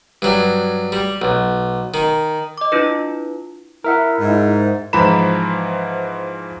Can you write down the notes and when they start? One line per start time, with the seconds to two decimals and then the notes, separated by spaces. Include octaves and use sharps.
0.22 G2 F#3
0.92 G3
1.22 B1
1.94 D#3
2.58 D#5 D6
2.72 D4 E4 F4 B4
3.84 E4 A#4 E5 F#5
4.20 G#2
4.93 G#2 E3 F3 A#5 B5 E7